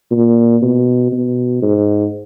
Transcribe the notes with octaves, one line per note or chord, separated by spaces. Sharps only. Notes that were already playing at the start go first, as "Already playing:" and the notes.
A#2
B2
B2
G#2